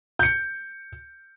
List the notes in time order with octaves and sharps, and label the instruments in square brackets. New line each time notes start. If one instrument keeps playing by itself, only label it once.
[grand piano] G6 C#7